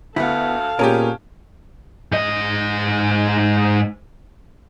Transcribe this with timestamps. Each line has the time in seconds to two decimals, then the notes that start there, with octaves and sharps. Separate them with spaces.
0.16 D2 B3 E4 A4 F5
0.79 A#2 B3 C#4 G4 G#4 A#4
2.12 G#2 D#5